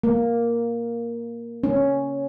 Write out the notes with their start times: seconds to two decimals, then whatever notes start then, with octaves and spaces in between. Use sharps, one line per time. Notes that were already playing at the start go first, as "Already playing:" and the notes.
0.03 A#3
1.64 C#4